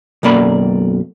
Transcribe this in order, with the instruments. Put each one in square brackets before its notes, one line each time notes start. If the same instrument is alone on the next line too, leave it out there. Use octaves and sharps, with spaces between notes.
[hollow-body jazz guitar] B1 F#2 A#3 D5 B5